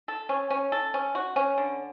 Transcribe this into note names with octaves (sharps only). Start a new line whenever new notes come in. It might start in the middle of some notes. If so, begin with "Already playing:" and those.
A4
C#4
C#4
A4
C#4
F#4
C#4
D3